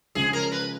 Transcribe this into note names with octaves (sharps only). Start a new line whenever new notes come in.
C#2 C#3 F3 G#3 C#4 G#4
A#4
B4